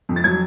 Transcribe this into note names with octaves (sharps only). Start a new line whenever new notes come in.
F2
A6
F#3 G#6